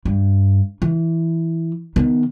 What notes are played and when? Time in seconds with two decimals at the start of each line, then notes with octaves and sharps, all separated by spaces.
0.05 G2
0.82 E3
1.96 D#3 B3